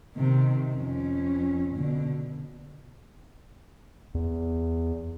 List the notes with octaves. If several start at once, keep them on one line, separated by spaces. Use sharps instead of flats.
C3 D#3
F2 C#4
B2 D3
E2